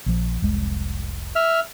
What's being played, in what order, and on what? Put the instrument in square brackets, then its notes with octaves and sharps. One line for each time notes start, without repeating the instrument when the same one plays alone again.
[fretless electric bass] A#1 F3
F1 C2 G#3
[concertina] E5 F6